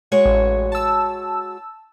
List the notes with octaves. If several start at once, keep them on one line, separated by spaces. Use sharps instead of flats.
G#3 F#4 C#5
A1
A5 E6